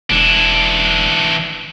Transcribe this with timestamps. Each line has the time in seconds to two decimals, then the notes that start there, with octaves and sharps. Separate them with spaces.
0.11 E1 E3 D4